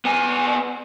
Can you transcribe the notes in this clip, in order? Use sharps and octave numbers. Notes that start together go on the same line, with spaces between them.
B3 G#5